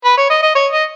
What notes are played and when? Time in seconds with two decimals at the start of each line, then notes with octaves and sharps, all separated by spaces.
0.05 B4
0.17 C#5
0.30 D#5
0.43 D#5
0.55 C#5
0.72 D#5